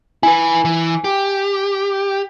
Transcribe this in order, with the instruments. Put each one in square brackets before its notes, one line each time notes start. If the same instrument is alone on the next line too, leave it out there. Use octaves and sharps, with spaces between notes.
[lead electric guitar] E4 B4 [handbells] G#5
[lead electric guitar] E3
G4